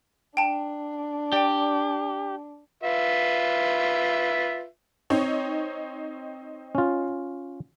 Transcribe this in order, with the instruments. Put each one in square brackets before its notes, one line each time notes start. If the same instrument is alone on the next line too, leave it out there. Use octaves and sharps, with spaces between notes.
[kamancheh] D4 [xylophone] G5 A5
[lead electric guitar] G4 [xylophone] D5 G5
[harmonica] F4 B4 E5
[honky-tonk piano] C4 D#4 C#5
[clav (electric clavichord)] C#4 F4